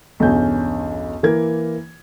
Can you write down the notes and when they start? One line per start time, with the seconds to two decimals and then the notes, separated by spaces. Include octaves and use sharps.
0.20 B1 E2 G2 C#4 G6
1.23 E3 A#3 A#4 G#6